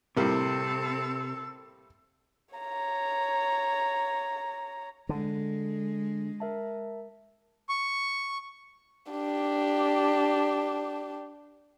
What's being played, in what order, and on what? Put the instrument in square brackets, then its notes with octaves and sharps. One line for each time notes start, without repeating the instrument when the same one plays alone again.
[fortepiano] A2 G3 A#3 [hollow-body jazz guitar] C3 [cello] C4 A4 [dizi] E6
[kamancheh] C#5 A#5
[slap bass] D3 [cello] G#3
[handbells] A#4 E5 A5
[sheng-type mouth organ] C#6
[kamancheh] D4 G4